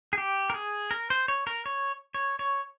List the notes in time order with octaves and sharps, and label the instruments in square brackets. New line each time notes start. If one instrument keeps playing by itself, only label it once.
[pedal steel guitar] G#4
G4
A#4
G#4
A#4
C5
C#5
A#4
C#5
C#5
C#5